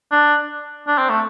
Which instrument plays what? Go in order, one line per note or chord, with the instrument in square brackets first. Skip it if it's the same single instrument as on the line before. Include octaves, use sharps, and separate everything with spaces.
[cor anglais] D4
D4
C4
A3